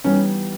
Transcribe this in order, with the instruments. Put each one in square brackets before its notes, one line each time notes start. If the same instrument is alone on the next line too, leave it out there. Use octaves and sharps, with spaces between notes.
[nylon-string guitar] E3 G3 B3 D#4 [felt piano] C#4